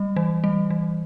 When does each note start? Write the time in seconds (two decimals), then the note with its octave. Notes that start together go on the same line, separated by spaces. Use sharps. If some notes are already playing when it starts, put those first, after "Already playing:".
Already playing: G3
0.16 E3
0.44 G3
0.70 E3